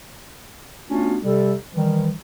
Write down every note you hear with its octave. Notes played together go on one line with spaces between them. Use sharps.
A3 B3 C#4 D4 F4 F#4
C3 G3 A4
D#3 E3 G3